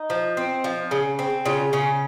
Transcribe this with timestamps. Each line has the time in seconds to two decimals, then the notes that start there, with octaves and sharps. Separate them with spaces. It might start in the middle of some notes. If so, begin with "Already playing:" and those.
Already playing: D#4
0.10 F3
0.37 C4
0.64 F3
0.91 C#3
1.19 C4
1.46 C#3 F4
1.73 C#3 C#4